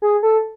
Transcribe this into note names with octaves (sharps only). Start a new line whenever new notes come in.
G#4
A4